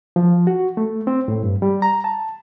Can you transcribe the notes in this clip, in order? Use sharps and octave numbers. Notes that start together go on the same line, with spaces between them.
F3
F#4
A3
C4
A2
G2
G3
A#5
A5